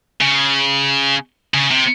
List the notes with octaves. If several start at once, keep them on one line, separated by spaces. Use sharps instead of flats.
C#3
C#3
C3